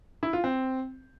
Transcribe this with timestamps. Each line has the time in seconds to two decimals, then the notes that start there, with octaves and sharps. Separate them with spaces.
0.23 E4
0.33 F4
0.44 C4